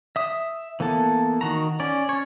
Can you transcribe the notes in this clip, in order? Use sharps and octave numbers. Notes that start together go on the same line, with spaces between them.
E5 D#6
E3 A#3 B3 A4
D#3 F#4 A#5
C#4 D5
C#4 C#5